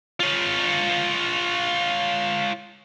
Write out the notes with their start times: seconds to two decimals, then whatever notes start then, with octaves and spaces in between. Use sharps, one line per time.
0.20 F4 C#5